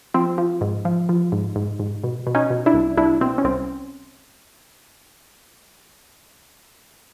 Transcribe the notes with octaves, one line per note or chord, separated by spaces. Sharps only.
F3 C4
F3
G#2
F3
F3
G#2
G#2
G#2
B2
B2
C#4 D#4
B2
D4 E4
C2
C2 D4 E4
B2 C4
C#4
C2 C4